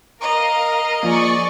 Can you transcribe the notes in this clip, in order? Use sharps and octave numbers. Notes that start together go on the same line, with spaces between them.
A#4 D#5 F5 A#5
F3 A#3 G#4 D5 C#6